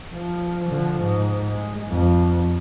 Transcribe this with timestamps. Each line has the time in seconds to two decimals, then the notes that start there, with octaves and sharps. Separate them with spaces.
0.13 F3
0.68 D3 F3
1.00 G#2
1.49 G#3
1.89 F2 F3